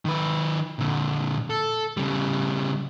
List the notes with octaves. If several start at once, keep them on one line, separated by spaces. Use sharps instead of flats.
D#3 B4
A#2 D3
A4
C#3 G3